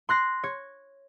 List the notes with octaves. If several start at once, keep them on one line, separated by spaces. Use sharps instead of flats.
C6 F#6 A#6 C7
C#5